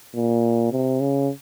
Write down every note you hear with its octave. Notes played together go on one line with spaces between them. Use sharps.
A#2
C3
C#3